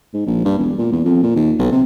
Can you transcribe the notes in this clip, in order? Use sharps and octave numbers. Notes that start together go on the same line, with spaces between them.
G#2
A#1
G2
E1
A#2
E2
F2
A#2
D#2
B1
C3